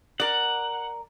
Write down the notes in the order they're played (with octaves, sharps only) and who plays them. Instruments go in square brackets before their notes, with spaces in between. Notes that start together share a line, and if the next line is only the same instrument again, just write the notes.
[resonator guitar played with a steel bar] A#4 D5 [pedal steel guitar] F#5